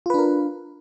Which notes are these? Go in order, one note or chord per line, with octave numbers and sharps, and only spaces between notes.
D4 F4 A#4 B4